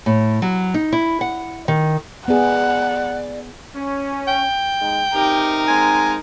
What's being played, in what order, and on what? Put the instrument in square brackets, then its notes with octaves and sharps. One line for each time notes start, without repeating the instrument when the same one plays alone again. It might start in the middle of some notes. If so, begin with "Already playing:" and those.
[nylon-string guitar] A2
F#3
D#4
E4
F#5
D#3
[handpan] B3 G#4 [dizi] D5 [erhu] F#5
[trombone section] C#4
[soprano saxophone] G5
[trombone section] G#3 D#4
[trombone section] C3 G4 [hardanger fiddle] D#4 A#4
[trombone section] G#3 A#3 C4 [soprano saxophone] G#5